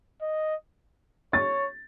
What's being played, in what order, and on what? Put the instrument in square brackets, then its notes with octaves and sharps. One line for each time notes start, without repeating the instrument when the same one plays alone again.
[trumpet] D#5
[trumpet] C#5 [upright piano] A6